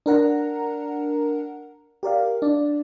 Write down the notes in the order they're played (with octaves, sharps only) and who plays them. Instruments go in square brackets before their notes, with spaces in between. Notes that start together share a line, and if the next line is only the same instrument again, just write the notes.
[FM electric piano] D4 A#4 F#5 A#5
G4 A#4 D5 F5
D4 D5